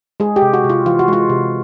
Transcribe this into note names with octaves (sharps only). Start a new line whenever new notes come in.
G#3 G#4
G4
C3
F#4
C3
F4
E3 F4
F#4
G#3 F4
C3